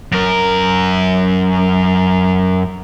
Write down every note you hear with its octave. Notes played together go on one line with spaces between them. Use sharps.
F#2 A#4